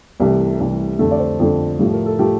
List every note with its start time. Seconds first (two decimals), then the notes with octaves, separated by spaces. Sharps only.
0.20 C2 C3 E3 A3 G4
0.60 C2 C3 E3 A3
0.99 F2 D3 A3 A4
1.11 D5
1.19 C5
1.39 F2 D3 A3 F4
1.79 A2 F3 A3 G4
1.93 A#4
2.06 A4
2.19 A2 F3 A3 G4